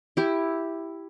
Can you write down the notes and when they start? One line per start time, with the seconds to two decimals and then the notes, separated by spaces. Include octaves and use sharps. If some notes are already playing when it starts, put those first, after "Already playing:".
0.17 E4 G4